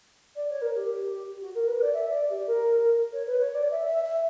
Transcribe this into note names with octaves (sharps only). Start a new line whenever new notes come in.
D5
C#5
A#4
G4
F#4
A#4
B4
D5
E5
D5
G4
A#4
C#5
B4
C#5
D5
E5
E5
E5